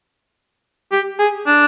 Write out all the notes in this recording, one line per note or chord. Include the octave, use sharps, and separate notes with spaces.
G4
G#4
D4